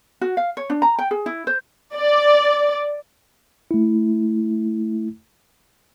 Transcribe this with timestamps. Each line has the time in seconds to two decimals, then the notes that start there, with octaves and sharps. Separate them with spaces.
0.21 F#4
0.37 F5
0.57 C#5
0.70 D4
0.82 A#5
0.98 G5
1.11 G#4
1.26 E4
1.47 C5
1.95 D5
3.71 A3 E4